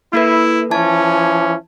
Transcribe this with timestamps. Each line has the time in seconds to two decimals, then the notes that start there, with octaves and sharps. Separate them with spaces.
0.13 A#3 E4 A4 B4
0.71 E3 F3 C#4 A5 G#6